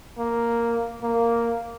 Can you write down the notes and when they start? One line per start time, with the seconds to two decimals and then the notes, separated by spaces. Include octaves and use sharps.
0.18 A#3
1.02 A#3